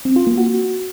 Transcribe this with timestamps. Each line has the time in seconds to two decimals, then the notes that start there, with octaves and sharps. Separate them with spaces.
0.05 C4
0.16 F4
0.27 A#3
0.38 F#4